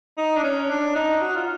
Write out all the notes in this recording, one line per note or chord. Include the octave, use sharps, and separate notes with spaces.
D#4
D4
C#4
D4
D#4
F#4
F4